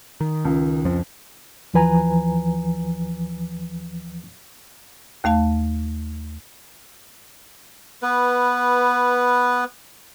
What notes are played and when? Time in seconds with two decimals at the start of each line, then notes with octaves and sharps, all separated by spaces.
0.21 D#3
0.45 C#2
0.85 F2 F3
1.74 D#2 E3 F3 B4 G#5 A#5
5.24 D#2 A3 F5 A5
8.02 B3 B4